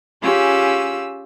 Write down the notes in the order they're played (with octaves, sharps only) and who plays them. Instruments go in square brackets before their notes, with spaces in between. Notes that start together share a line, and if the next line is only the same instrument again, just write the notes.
[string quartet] C#4 F4 G4 G#4 E6